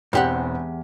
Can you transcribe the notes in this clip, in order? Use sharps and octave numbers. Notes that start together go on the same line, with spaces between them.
E1 E2 C4 G4 F#5